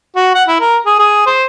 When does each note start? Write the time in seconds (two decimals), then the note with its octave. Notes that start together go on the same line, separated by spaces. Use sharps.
0.16 F#4
0.35 F#5
0.48 E4
0.61 A#4
0.86 G#4
0.99 G#4
1.27 C5